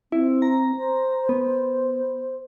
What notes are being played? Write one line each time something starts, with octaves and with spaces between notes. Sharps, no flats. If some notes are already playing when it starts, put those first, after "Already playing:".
C4 E4
A#5
C5
B3